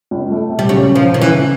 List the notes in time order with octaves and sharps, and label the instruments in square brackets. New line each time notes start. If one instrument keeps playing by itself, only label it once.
[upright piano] C#2
A3
C3
[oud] G3
[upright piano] C#3 [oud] F#3
[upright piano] C#4
[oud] F3
[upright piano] C#4
[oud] D#3
E3
[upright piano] C#3